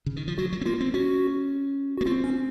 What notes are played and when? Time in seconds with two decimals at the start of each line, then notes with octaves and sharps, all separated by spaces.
0.06 C#3
0.16 D#3
0.28 F3
0.38 F#3 F#4
0.53 F#3
0.61 C4
0.66 A#3 F4
0.81 C4
0.94 C#4 F#4
1.98 F#4
2.01 A#3
2.06 C4 F4
2.24 C#4